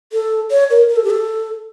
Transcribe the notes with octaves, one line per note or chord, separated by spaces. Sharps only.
A4
C#5
A#4
A#4
A4
G4
A4